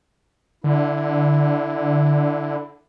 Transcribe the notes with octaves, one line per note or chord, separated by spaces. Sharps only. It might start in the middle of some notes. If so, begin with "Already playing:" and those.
D3 E4